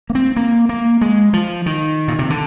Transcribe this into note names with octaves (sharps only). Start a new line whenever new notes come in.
A#3
C4
A#3
A#3
G#3
F3
D#3
A#2
C3
D3